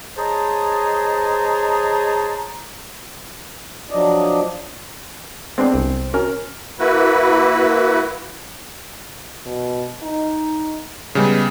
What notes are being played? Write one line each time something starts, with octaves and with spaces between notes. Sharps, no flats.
G#4 C5 C#5 D#5 A5 A#5
F3 F#3 D4 D5 D#5
G#3 B3 C4 D4
C2
C#4 F#4 A#4
A#3 E4 F#4 B4
B2
D#4
C#3 G3 G#3 B3